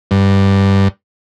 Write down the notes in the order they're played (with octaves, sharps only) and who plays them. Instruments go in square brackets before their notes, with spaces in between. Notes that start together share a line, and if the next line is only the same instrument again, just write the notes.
[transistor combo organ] G2